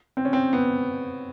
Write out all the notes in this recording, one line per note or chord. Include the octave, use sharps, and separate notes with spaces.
C4
C#4
C4
B3